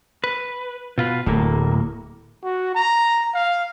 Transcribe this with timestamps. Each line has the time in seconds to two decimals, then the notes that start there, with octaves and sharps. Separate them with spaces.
0.24 B4
0.98 B2 F4 B4
1.26 D1 A2 A#3
2.43 F#4
2.75 A#5
3.34 F5